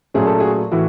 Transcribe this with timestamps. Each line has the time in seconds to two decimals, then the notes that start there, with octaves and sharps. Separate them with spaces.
0.14 A#2 F#3 A3 C#4 G#4
0.27 A4
0.40 F#4 G#4
0.72 A2 E3 F#4